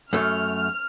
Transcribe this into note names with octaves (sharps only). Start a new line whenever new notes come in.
F#2 A3 F6